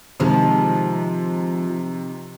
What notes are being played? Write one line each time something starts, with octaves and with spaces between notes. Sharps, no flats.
C3 D#3 F3 G#3